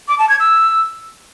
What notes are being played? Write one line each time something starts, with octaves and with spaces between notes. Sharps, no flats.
D6
A5
G#6
E6